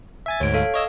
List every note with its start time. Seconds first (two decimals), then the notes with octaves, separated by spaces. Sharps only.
0.26 E5 G#5 A6
0.40 D2 G#2 C#5 D7
0.54 A4 F5
0.74 C#5 D#5 E6